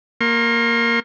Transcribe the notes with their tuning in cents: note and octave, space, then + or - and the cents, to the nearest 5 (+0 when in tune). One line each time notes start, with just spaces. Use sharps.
A#3 +0 C6 +40